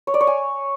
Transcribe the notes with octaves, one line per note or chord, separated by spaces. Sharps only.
C#5
D5
C#5
G#5